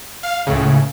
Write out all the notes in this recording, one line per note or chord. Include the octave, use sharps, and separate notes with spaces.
F5
C#2 A2 C#3